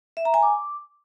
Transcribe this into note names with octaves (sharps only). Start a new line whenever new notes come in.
E5
A#5
G#5
D6